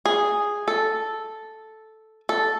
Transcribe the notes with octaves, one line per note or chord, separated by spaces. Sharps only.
G#4
A4
A4